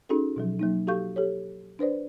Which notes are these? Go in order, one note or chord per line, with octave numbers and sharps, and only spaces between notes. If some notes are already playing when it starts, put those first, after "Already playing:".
C#4 D#4 F#4 G#4 A4
B2 F3 F#3
F#3 A#3 D#4
F#4 G4 A4 F5 C#6 G6
G4 A4 C#5
D4 B4 C5 D5